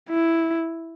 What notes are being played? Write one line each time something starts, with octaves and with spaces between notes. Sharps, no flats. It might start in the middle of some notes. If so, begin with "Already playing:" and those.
E4